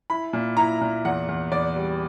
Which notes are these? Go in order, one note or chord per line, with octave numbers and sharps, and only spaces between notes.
E4 B5
A#2
E4 A#5
A#2
E2 F#5
E2
E2 D5
G3